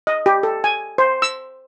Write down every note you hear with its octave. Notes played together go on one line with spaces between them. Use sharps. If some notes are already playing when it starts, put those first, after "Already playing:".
D#5
G4
A4
G#5
C5
E6